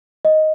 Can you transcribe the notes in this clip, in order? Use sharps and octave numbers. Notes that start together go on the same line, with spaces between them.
D#5